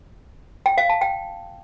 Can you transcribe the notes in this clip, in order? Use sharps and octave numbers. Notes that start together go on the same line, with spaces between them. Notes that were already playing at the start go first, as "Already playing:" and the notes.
G5
F5
A5
G5